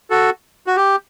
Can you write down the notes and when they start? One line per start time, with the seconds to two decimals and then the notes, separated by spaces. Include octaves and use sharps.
0.10 F#4 A4
0.67 F#4
0.76 G4